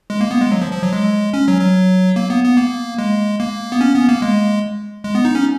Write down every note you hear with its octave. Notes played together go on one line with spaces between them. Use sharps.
G#3
A#3
B3
G#3
F#3
F3
F3
F#3
G#3
C#4
F#3
F#3
A#3
B3
B3
A#3
G#3
A#3
B3
C#4
B3
A#3
G#3
G#3
B3
D#4
C#4